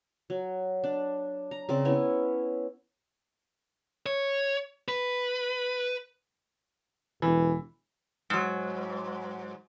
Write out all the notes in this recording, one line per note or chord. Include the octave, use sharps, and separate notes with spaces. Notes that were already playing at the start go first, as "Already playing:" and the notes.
F#3
D4
A#5
C#3 C4 D5
B3 C#4 E4
C#5
B4
E1 E3
G#2 F#3